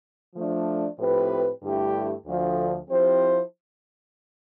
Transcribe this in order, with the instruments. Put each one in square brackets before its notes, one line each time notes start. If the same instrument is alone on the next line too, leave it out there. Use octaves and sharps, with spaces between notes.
[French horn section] F3 A3 D4
A2 F3 C4 G4 B4
G2 D3 A3 E4 G4
D2 D3 F3
F3 C4 E4 G4 C5